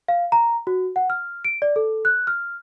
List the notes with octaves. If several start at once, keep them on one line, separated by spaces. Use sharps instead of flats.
F5
A#5
F#4
F#5
F6
D7
D5
A4
F#6
F6